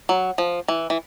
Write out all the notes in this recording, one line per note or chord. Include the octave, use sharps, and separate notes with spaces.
F#3
F3
E3
E3